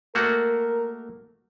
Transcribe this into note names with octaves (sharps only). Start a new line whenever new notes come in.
A3 A#3 F#4 A#4